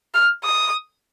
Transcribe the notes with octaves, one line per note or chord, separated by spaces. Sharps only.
F6
D#6